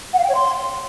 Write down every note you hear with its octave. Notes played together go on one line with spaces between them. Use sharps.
F#5
F5
G5
C#5
C6